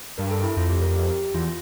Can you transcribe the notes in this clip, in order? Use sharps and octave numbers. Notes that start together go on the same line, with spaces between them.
G2 A#4
A4
E4
F2 F4
G4
A#4
G4
E2 F4